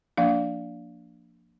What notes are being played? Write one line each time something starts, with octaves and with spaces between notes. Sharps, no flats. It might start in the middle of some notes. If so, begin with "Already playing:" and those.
F3 A#3 D4 F5